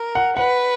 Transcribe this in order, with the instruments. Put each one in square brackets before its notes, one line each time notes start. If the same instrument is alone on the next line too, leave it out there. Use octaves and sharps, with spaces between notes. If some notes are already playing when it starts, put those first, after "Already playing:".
Already playing: [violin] A#4
[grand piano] F#5
[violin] B4 [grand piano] F#5